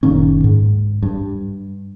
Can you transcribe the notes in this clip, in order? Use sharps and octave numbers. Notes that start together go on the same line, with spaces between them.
F#1 A#2 D#3 C#4
G#2
G2